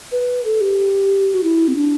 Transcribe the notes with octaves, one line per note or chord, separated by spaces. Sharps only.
B4
A4
G4
F#4
E4
C4
D4